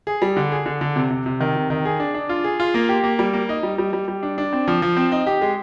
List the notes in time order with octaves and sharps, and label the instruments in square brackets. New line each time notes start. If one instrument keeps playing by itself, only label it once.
[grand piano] G#4
G3
D3
G#4
D3
D3
C3
C3
C3
D#3
C3
D#3
G#4
D4
D4
F4
G#4
F4
A#3
G4
A#3
G3
A#3
D#4
G3
G3
G3
G3
D4
D4
C4
F3
F3
C4
D#4
G4
G#3